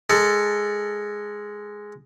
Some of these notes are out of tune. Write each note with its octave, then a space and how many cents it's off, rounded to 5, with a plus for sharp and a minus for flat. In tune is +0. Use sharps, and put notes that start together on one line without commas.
G#3 +0 A4 +20